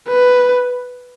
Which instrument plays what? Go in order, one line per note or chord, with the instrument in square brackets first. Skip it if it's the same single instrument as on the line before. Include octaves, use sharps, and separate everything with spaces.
[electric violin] B4